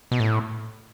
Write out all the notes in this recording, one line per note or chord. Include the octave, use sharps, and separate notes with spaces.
B2
A2